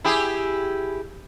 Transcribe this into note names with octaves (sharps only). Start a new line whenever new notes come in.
E4 G4 G#4